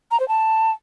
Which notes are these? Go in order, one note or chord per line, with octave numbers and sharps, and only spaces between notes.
A#5
C5
A5